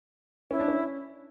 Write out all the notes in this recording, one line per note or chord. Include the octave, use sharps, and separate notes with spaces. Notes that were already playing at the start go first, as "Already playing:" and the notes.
C#4 E4
D4
C#4